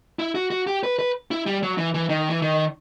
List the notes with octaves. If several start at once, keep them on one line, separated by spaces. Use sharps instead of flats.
E4
F#4
F#4
G4
B4
B4
E4
G3
F#3
E3
E3
D#3
E3
D#3